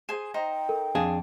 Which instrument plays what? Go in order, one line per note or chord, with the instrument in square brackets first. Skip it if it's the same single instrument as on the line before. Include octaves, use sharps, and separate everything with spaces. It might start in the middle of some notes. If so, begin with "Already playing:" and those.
[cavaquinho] G#4 C5 G#5 [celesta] E7
[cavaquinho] D#4 C5 A#5 [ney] G5
[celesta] A4 A#4
[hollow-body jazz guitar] F2 D4 G#4 [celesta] F5